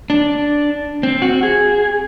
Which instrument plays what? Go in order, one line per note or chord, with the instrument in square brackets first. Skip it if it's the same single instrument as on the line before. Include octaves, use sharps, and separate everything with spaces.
[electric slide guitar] D4
C4
F#4
G#4